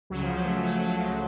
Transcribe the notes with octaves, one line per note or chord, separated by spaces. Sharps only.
C#2 C#3 F#3
F3
F#3
A3
F#3
F#3
F3